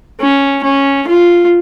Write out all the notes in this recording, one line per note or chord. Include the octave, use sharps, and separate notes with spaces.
C#4
C#4
F4